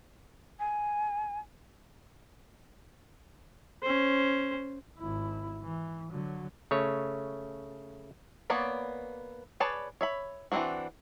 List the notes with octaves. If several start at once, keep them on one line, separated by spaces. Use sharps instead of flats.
G#5
C#4 C5
G#1 E4
E3
D3 F#3
C#3 A3 C#5
A#3 B3 C#5 D5 B5
G#4 B4 C#5 D5 A5
C#5 E5 B5
E3 A3 C4 D4 F#4